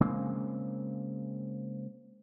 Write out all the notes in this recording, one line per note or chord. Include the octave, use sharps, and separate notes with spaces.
C#3 G#3 A#3 C4